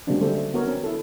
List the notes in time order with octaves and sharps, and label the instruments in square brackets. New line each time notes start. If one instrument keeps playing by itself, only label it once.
[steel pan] C#3 F#3 G#3 A#3 C4 D4
D3 G3 A3 C4 A4 C5
B3 F#4 A#4 C#5
C4 C#4
E4 A4